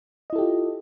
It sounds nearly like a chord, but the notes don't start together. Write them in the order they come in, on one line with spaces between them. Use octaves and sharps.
D#5 E4 A4 G4 F4